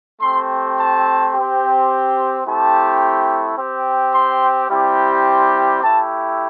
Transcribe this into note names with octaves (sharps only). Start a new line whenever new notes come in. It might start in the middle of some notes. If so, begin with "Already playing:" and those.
A3 C4 G4 C6
A5
G4
C4
A3 C4 E4 G4 A5
C4 G4
C6
G3 C4 E4 G4
C6
A3 E4 G4 A5